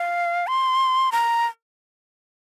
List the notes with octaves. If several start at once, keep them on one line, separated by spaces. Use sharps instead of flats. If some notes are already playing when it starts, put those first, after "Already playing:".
Already playing: F5
C6
A#5